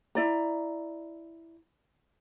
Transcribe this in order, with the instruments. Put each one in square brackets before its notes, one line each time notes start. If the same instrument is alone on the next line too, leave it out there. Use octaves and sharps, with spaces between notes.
[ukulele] E4 D5 A#5